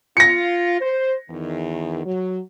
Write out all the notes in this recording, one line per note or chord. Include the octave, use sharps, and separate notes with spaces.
F4 A#6 C#7
C5
E2 D#3
F#3